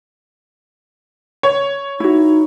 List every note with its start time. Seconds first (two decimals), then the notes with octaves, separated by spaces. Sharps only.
1.43 C#5
2.00 D#4 E4 F#4